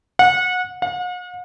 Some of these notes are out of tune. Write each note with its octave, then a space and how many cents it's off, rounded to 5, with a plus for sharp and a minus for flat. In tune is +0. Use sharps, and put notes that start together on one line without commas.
F#5 -25
F#5 -45